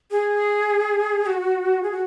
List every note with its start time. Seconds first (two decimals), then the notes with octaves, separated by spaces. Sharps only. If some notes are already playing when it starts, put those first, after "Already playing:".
0.11 G#4
1.26 F#4
1.83 G#4
1.92 F#4